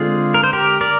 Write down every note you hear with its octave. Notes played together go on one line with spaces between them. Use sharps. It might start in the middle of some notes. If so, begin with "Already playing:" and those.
Already playing: D3 G#3 C4 F4 G#4
A#4
C5
G4 A#4
A#4 D5